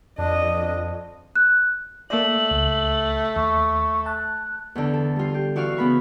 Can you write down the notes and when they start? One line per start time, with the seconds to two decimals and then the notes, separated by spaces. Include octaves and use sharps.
0.18 F2 D4 D#5
1.35 F#6
2.10 A3 A#3 D5 F#7
2.51 C#2
3.36 D#2 C#6
4.06 A5 F#6
4.75 E2 D3
4.93 A4
5.16 G3 F4
5.34 G4
5.56 E3 F#4 D5 F5 C#6 F6
5.77 C#3 B3 B5 C#6